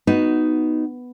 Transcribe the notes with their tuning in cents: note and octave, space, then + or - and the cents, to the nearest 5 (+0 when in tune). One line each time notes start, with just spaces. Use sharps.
B3 +5 D#4 +0 F#4 +0